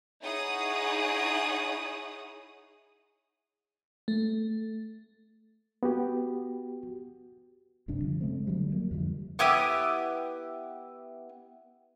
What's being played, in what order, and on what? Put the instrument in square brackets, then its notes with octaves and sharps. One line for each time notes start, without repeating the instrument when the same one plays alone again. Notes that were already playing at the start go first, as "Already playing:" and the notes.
[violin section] D#4 E4 G#4 C#5 F#5 D#6
[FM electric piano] A3
[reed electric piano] B3 F#4 G4
[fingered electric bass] F#1 G2 C3 D4
D3 F3
C#3 G#3 A3 C4
D3 F#3 G3 A3
F#3 G3 A#3
F2 D3 F3 G3
[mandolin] B3 E4 G4 D#6